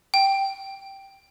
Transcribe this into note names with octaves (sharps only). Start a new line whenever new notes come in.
G5